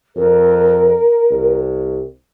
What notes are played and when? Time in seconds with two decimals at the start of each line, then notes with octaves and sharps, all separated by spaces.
0.16 F2 A#4
1.30 C2